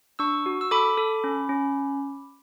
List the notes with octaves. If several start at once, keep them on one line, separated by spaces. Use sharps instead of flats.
D4 C#6 E6
F#4
E6
A4 B5 D6
A4
C#4
C#4